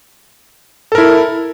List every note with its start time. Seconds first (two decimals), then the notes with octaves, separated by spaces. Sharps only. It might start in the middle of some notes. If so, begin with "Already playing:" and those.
0.92 A4
0.95 A#4
0.98 E4